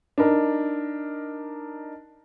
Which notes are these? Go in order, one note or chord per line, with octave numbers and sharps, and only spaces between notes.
D4 D#4 A#4